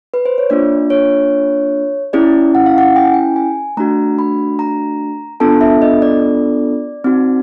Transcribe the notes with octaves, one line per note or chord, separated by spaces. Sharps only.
B4
C5
C#5
A#3 D4 F4 D5
C#5
C#4 E4 G#4 D5
F#5
F5
F#5
G5
G#5
G5
G#5
A3 D4 F#4 A#5
B5
A#5
B3 D4 F4 A4 A5
E5
D#5
D5
C4 D#4 F#4